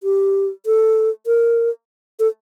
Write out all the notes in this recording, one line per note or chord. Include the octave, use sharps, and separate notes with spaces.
G4
A4
A#4
A4